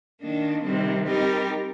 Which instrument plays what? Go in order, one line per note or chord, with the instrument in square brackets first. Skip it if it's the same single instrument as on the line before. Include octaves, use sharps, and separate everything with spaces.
[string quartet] D#3 A#3 D4
C3 D#3 G3 C4
G3 C4 D#4 G4 A#4